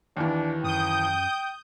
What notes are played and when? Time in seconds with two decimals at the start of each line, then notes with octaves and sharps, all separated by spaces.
0.17 D#2 E3 D4
0.64 F#2 G5 D#6 G6